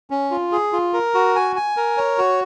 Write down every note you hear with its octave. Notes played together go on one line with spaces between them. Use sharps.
C#4
F4
G#4
F4
A#4
F#4
G#5
G#5
A#4
C#5
F#4